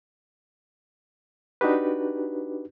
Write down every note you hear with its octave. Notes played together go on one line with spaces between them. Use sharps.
D4 D#4 F#4 G4 B4